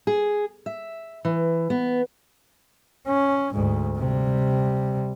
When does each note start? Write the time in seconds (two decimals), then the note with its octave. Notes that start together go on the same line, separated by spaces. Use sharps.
0.07 G#4
0.66 E5
1.25 E3
1.70 B3
3.08 C#4
3.54 D2 G#2
3.99 C3 G3